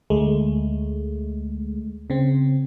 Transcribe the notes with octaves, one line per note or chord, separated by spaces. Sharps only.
D2 G#3 A3
C#3 C4